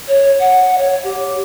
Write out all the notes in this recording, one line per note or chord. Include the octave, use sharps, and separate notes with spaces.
C#5
F#5
C#5
G4